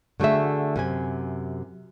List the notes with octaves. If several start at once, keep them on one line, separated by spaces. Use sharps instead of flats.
D3 A3 F#4 G#4 E5
F#2 C3 G#5